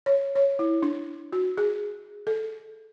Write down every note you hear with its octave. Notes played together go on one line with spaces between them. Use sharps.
C#5
C#5
E4
D4
F#4
G#4
A4